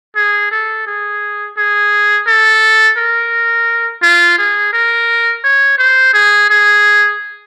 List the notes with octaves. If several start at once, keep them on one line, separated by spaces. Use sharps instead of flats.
G#4
A4
G#4
G#4
A4
A#4
F4
G#4
A#4
C#5
C5
G#4
G#4